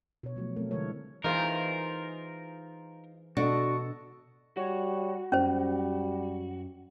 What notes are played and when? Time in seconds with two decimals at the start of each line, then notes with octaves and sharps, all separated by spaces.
0.23 B2 C#5
0.36 F3 F#3 A3
0.56 A3 C4 A#4
0.71 D3 E3 G#3 A#4 C#5
1.24 E3 D#4 F4 G#4 A#4 C5
3.37 B2 D4 F#4 A4 D#5
4.57 G3 F#4 C#5
5.32 F#2 G3 C#4 C5